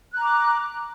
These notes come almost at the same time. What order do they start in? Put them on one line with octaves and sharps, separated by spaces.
F#6 A#5 D6